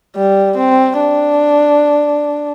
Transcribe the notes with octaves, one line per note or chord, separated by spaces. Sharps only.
G3
C4
D4